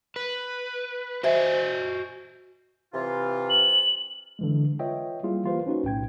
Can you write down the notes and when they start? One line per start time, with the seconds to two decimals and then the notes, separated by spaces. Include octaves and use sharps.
0.16 B4
1.24 F#4 C5 D#5 E5 G#5
2.93 C3 E3 F4
3.50 F#7
4.39 D3 E3 G#3
4.79 F4 B4 C#5 D#5 E5 G5
5.23 G3 A#3 E4 F4 G#4
5.44 E3 A#3 F4 G4 B4 C5
5.66 C#4 D#4 F#4 B4
5.84 B1 A2 G5 G#6